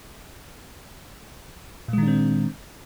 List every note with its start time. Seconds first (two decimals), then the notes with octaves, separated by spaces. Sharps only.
1.88 A#2
1.93 G#3
1.98 D#3
2.03 D4
2.08 C4